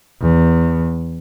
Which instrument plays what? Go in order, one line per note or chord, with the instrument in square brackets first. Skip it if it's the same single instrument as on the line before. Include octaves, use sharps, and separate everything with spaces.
[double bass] E2